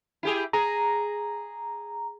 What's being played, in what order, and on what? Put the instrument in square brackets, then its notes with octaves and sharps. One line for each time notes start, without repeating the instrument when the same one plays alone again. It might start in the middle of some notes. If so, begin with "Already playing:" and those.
[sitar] E4 G4 G#4
[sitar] G#4 [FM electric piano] A#5